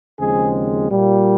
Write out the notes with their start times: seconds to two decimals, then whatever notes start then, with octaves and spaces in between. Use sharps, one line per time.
0.20 D#2 C#3 F3 G#3 C4 G#4
0.91 A#2 G3 A#3